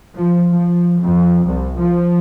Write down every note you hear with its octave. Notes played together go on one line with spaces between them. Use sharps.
F3
F3
F2
C2
F3